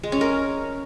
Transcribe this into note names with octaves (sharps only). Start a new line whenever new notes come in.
G#3
C#4
A#4